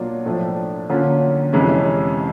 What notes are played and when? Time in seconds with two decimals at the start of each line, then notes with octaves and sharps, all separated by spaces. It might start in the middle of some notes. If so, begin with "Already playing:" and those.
Already playing: B2 F#3 A#3 D4 F4
0.25 A2 F3 A3 D4
0.90 D3 F#3 A#3 C#4 F4
1.53 F2 C3 E3 G#3 C#4